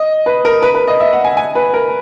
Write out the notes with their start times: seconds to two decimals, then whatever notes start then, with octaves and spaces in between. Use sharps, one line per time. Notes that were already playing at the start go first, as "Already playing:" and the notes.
Already playing: D#5
0.26 B4
0.45 A#4
0.62 B4
0.75 B4
0.87 D#5
1.00 E5
1.13 F#5
1.24 G#5
1.37 G#5
1.55 B4
1.73 A#4